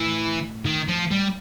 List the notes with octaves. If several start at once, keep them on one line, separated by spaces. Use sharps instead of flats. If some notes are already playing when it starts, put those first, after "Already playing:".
Already playing: A2 E3
D#3
F3
G3